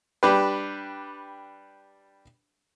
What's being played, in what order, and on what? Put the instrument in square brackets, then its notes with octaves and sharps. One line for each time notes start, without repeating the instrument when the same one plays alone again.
[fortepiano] G3 D4 G4 B4